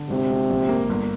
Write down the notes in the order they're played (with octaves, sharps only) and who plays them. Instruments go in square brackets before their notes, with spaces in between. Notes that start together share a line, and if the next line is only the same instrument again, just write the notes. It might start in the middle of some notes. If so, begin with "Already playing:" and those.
Already playing: [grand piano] D3
[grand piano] G#1 [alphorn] C3
[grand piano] G#1
A#1
A#3
G1